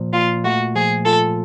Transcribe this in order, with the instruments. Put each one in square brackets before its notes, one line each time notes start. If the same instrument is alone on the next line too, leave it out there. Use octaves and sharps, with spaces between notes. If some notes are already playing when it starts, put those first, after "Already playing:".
Already playing: [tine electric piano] A#2 F3
[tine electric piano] A#2 [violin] F4
[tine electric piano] A3 [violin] F#4
[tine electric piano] F3 [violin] G#4
[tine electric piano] F4 [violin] A4